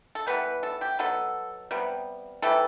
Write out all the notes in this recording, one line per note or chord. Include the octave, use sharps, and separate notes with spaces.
A4
E3 G3 B3 B4
A4
G4
B2 F#3 B3 A4
C3 G3 B3
C3 E3 G3 A4